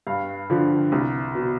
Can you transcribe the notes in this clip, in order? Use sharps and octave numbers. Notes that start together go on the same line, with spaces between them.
G2 F5
D3 F3
C2
B2